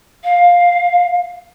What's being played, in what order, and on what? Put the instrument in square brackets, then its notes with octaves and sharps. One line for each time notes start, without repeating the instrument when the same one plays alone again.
[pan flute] F5